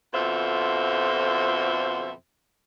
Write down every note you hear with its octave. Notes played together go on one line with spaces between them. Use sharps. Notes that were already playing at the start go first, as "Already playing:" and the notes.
F2 B2 D3 F4 C5 E5